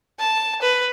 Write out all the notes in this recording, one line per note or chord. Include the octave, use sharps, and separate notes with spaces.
A5
B4